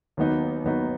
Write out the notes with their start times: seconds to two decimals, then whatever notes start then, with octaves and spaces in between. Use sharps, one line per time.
0.17 D#2 D#3 F#3 B3 D#4
0.64 D#2 D#3 F#3 B3 D#4